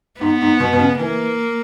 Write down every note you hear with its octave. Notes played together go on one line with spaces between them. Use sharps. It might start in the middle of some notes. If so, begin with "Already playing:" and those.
G#2 B3
G#2
B2
B2
C#3
E3 A#3